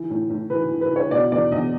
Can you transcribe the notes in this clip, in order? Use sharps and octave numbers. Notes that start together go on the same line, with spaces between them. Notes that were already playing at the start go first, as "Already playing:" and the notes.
Already playing: E3
A2
A2
E3 B4
E3
B4
E3 C#5
B2 D5
E2 D5
E2 D#5